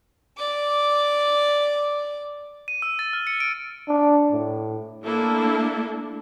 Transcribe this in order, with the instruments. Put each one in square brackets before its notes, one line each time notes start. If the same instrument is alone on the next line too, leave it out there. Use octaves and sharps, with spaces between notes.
[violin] D5 D6
[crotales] D#7
E6
A6
F6
C#7
D7
[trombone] D4
A2
[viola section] A3 A#3 D4 E4 A4